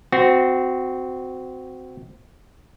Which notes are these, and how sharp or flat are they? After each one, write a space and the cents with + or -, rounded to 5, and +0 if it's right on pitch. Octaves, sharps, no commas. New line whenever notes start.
C4 -20 F#4 +0